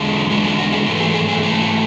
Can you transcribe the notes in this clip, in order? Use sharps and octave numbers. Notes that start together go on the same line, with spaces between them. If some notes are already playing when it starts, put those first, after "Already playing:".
Already playing: E2 D3 G#3
E2 D3 G#3 F#4
G#4
F#4
G#4
G#2 E3 A3 F#4
G#4
G#4
G#4
G#2 E3 A3 G#4
F#4